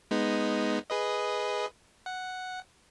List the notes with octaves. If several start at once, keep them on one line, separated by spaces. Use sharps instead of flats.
G#3 B3 D#4
G#4 B4 D#5
F#5